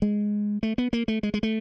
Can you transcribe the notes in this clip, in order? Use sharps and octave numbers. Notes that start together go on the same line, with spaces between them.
G#3
A3
B3
A#3
A3
G#3
G#3
A3